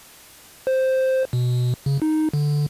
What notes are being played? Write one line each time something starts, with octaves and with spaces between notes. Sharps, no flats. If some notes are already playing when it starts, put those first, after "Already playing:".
C5
B2
C#3
D#4
D3